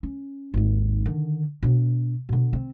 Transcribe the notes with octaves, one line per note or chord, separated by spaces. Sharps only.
C#4
G#1 D#2
D3 D#3
B2 D4
B2 D3
C4